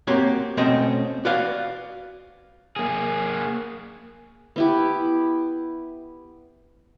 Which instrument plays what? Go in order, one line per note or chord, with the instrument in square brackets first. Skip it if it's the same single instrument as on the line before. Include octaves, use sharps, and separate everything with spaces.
[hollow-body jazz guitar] A#3 C4 F#4 G4 C#5
B2 A3 C4 C#4 C5 D#5
F#4 B4 D5 F5
[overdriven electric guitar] A#3 G#4
[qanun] B3 E4 G4